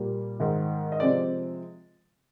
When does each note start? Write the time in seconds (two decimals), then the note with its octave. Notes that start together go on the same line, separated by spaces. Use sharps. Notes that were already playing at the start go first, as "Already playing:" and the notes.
Already playing: A#2 G3 A#3
0.40 G#2 D#3 G#3
0.92 D#5
1.00 C3 F3 G#3 C4 D5